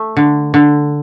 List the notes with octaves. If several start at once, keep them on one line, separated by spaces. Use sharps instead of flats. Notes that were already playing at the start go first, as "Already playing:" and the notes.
Already playing: A3
D3
D3